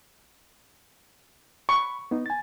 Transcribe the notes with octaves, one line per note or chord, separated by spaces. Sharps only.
B5 C#6
B3 D#4
G#5 A6